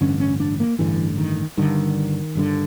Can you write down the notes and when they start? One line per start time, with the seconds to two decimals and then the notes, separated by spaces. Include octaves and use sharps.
0.01 A1 G2 D3 C#4
0.20 C#4
0.40 D4
0.60 A#3
0.79 A1 G2 D3 E3
1.18 D#3
1.57 G1 G2 D3 D#3
2.35 G1 G2 D3